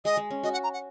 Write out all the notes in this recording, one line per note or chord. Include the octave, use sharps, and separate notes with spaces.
G#3 D#5
G#3
C#4
F#4 D#5
F#5
A#5
F#5